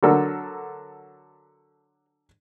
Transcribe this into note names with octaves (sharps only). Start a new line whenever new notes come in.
D3 F#3 A4 A#4